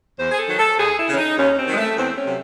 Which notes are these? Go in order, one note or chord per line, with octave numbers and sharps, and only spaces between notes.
E2 C5
G#4
A4
D#3 F#3
A4
D#2 G#4
E4
C#3 E3 C#4
D#4
D#2 C#4
C4
D#3 F#3 G#3
A3
E2 C4
C#4
C3 F#3